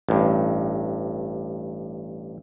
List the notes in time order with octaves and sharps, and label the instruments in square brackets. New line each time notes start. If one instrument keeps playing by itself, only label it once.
[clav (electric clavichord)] A1 G2